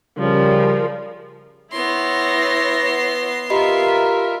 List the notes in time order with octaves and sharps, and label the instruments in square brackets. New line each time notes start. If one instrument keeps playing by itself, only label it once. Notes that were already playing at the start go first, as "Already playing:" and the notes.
[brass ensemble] C#3 G3 [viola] F3 A#4
[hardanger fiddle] B3 C6 [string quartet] E4 C#5 A#6
[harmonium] F4 A#4 [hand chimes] G4 D#5 B5 [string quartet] E5